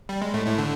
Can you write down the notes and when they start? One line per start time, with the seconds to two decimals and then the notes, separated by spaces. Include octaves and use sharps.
0.09 G3
0.22 G#3
0.33 A2 A3
0.46 A2 A3
0.58 D3 D4